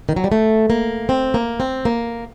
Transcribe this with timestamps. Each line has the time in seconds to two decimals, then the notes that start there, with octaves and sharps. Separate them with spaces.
0.09 D#3
0.16 F#3
0.24 G3
0.32 A3
0.70 A#3
1.09 C4
1.34 A#3
1.60 C4
1.85 A#3